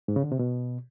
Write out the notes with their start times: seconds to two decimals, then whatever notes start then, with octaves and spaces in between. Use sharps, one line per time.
0.08 G#2
0.16 C#3
0.24 D3
0.32 C3
0.39 B2